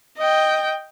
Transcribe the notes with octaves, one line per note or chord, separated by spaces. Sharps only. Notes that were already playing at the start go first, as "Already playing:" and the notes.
D#5 G5